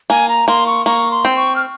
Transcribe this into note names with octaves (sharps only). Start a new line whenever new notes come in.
A#3 G#5
A#5
A#3 C6
C#6
A#3 C#6
C6
C4
C#6
F6